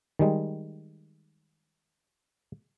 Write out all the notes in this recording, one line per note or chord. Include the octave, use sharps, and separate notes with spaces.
D#3 G3 G#3